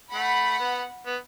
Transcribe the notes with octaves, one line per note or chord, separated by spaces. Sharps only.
A3 F#5 B5
B3
B3